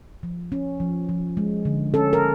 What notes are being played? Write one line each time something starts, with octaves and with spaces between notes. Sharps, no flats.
F3
C#4
F3
F3
G#3
D3
C#4 A4
A#4